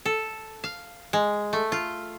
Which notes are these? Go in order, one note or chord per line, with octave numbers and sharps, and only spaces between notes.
A4
F5
G#3
A3
F4